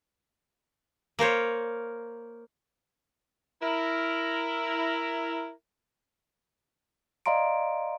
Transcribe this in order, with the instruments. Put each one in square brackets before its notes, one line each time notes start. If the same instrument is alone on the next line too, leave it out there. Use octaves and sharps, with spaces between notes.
[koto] A#3 A#4 C5 C#5
[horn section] E4 A#4
[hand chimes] D5 D#5 F5 A#5 C6 D7